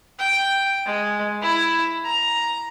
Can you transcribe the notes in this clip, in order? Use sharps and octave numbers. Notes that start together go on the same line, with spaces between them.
G5
G#3
E4
A#5